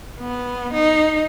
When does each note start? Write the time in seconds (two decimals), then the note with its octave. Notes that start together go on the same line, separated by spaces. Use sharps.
0.19 B3
0.74 D#4